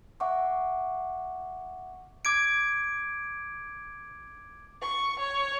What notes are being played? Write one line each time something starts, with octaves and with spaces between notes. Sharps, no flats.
E5 F#5 C#6 D6
D6 G#6 D7
C#6
C#5